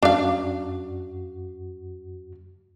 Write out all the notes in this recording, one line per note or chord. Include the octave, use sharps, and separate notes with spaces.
F#2 D4 F#4 F5